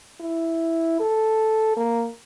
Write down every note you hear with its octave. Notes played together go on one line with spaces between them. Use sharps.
E4
A4
A#3